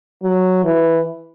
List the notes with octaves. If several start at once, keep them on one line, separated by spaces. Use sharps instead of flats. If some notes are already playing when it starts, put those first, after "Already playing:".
F#3
E3